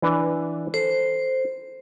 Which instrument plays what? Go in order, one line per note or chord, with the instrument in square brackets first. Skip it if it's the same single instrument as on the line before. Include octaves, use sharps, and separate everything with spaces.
[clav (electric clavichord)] E3 D4 B4
[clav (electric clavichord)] A4 [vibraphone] C5